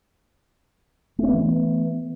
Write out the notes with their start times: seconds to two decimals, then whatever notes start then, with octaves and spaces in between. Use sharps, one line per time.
1.19 A3
1.23 C#4
1.28 B3
1.33 E3